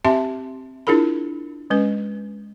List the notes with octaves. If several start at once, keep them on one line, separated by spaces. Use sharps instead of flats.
C4 G4 E5 A5 C6
D4 E4 F4 G#4 A#4 B5
G#3 C#4 B4